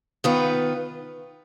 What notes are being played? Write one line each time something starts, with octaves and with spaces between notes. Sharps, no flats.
D#3 B3 F4 B4